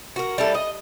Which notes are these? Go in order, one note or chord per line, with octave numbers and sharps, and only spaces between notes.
F#4 A#4
G3 E4 A4
D#5